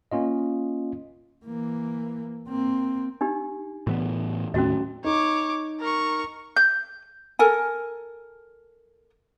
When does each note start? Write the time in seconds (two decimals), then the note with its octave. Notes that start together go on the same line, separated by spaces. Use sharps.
0.12 A#3 C#4 F4 D#5
1.45 E3 A#3
2.48 A#3 C4
3.21 D4 D#4 G4
3.87 A2 E3 B3
4.54 D#2 A2 C#4 F#4 D#5
5.04 D#4 C#5 D6
5.80 A#4 C#6
6.56 G6
7.39 A4 A#4 G#5